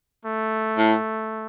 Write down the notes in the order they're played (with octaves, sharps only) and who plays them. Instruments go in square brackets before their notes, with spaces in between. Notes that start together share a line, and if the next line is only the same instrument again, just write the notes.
[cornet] A3
[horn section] A2